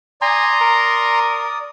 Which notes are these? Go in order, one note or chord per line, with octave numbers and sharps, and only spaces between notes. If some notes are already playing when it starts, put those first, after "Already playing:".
D5 G#5 A#5 C6 D#6
A#4